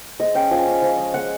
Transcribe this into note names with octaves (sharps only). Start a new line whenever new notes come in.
G#3 D#5
C#4 G5
F3 G#5
C#4
F3
G#3
G#3 F#5